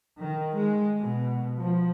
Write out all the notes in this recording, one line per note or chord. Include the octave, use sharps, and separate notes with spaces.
D#3
G#3
B2
F3